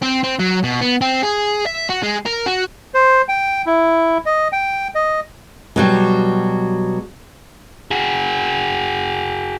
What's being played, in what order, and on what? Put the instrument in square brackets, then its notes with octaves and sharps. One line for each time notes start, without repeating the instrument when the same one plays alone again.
[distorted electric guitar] C4
C4
F#3
B2
B3
C4
G#4
E5
F#4
G#3
A#4
F#4
[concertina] C5
G5
E4
D#5
G5
D#5
[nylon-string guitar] B2 F#3 G3
[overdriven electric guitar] F#4 G#4